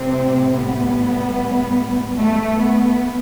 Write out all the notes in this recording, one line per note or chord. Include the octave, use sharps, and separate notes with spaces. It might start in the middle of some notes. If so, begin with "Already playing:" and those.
Already playing: A2 C3 G3 C4
B3
A3
B3